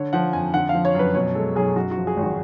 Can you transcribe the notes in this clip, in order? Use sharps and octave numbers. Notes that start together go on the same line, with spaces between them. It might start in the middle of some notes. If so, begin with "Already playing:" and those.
Already playing: D3 C#5
F3 F#5
F2 G#5
D3 F#5
F5
F3
C#5
F#2 B4
B2 C#5
G#3 A4
B1 G#4
F#2 F#4
F#4
F3
G#4
G#1
F#4